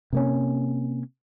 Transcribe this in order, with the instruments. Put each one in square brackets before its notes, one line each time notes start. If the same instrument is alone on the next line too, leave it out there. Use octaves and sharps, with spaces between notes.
[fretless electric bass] C3 A#3 C#4